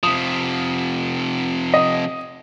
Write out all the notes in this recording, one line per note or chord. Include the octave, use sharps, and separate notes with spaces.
C3 F3 D#6
D#5